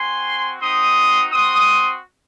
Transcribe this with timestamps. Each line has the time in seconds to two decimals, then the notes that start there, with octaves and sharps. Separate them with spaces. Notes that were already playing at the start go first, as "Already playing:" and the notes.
Already playing: C4 F#4 G#5 C6
0.61 C4 D#4 F#4 C6 D#6
1.32 C4 F#4 C6 D#6